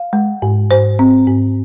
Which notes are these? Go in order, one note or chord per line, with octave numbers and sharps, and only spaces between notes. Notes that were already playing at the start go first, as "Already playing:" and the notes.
Already playing: F5
G#3
G#2
G#2 C5
C4
G#2